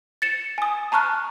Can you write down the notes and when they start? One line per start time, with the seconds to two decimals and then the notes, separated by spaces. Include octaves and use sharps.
0.22 A6 C#7 E7
0.58 G#5 D#6
0.92 A5 A#5 C#6 F6 F#6